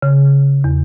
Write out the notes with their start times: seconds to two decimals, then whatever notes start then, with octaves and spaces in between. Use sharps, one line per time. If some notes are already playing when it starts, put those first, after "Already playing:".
0.02 C#3
0.64 E2